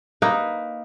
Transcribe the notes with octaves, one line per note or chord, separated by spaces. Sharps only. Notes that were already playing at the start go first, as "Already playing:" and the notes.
A#3 D#4 B4